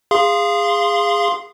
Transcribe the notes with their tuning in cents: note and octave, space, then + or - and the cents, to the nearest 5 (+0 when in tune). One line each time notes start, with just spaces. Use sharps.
G#4 -20 F5 -10 C6 +0